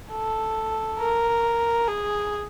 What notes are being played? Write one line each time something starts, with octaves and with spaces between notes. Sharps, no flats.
A4
A#4
G#4